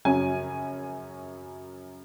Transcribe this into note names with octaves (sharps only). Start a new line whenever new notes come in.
F#2 C#3 F#3 C#4 G#5